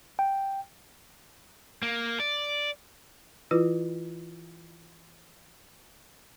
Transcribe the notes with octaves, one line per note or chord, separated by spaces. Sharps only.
G5
A#3
D5
E3 E4 F4 B4